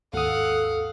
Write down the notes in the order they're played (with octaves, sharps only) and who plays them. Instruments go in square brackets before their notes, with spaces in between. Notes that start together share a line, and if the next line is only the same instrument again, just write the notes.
[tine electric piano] G#1 D#6 [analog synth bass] D#2 [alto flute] A4 [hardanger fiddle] F5 F#5